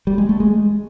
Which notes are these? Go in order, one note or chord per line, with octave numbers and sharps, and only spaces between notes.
G3
G#3
A3
G#3